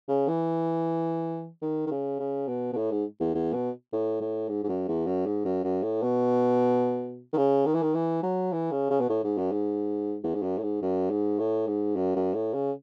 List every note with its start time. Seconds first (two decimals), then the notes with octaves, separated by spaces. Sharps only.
0.08 C#3
0.28 E3
1.62 D#3
1.87 D#3
1.91 C#3
2.20 C#3
2.48 B2
2.73 B2
2.77 A2
2.91 G#2
3.20 E2
3.35 E2
3.53 B2
3.92 A2
4.21 A2
4.49 G#2
4.64 G#2
4.69 F#2
4.88 E2
5.06 F#2
5.26 G#2
5.45 F#2
5.64 F#2
5.83 A2
6.03 B2
7.33 D#3
7.37 C#3
7.66 D#3
7.74 E3
7.82 D#3
7.94 E3
8.23 F#3
8.52 E3
8.71 C#3
8.90 C#3
9.00 B2
9.09 A2
9.24 G#2
9.37 F#2
9.52 G#2
10.23 E2
10.35 G#2
10.43 F#2
10.58 A2
10.62 G#2
10.82 F#2
11.10 G#2
11.39 A2
11.67 G#2
11.96 F#2
12.16 F#2
12.34 A2
12.54 C#3